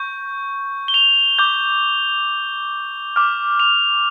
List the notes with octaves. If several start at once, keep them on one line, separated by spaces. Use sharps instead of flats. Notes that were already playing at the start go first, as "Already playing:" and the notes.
Already playing: C#6 G6
G7
F7
D6 G6
D6 F6
F7